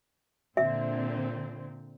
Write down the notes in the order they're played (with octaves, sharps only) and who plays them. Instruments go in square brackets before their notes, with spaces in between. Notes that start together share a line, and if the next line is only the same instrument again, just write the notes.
[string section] A#2 D3 C4 [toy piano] E5